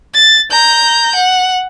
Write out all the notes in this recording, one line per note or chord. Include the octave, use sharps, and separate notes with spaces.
A6
A#5 G6
F#5